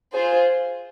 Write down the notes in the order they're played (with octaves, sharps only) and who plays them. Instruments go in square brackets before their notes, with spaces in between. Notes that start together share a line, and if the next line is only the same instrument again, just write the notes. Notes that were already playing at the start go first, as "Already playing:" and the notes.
[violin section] F4 G#4 C5